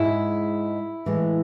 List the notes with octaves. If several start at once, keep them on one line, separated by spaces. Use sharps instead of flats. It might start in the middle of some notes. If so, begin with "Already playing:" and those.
Already playing: G#2 G#3 E4
A2 E3 G#3